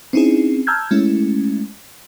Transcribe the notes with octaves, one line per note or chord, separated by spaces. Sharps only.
C4 C#4 D#4 E4 G#4
A5 A#5 E6 F6 G6 G#6
G#3 A3 C#4 E4